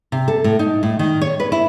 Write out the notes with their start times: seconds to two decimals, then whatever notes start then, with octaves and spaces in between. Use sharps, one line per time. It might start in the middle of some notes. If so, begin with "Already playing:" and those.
0.12 C3
0.28 A4
0.44 A2
0.59 D#4
0.83 A2
0.99 D#3
1.21 C#5
1.40 B4
1.52 E4